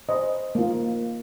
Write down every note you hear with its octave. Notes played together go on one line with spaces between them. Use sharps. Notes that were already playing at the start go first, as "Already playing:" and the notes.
C5 D#5
A#3 F4